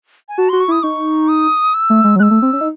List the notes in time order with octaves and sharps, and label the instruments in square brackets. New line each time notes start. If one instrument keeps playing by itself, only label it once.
[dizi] G#5
[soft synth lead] F#4 [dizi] A5
[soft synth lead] F#4 [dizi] C6
[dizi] C#6
[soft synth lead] E4 [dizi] D#6
[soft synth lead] D#4 [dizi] C#6
[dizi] D#6
E6
[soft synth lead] A3
G#3
F#3
[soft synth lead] G#3 [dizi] E6 F#6
[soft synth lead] A3
C4
C#4
D#4